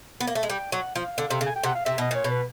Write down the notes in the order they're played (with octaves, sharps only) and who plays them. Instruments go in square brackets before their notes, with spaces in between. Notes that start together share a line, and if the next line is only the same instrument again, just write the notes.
[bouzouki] B3
A#3
A3
G#3
[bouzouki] G3 [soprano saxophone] G5
[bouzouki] F#3 [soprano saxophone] F#5
[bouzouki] F3 [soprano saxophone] F5
[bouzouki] D3
C3
C#3
[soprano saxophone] G#5
G5
[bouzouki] C3 [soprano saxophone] F#5
[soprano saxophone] F5
[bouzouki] C3 [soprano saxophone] E5
[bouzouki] B2 [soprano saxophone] D#5
[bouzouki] A#2 [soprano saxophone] C#5
[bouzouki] B2
[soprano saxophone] B4